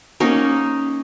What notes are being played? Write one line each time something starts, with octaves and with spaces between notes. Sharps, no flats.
A#3 C#4 D#4